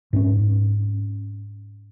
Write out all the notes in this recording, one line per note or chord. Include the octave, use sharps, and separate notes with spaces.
G#2 C4 C#4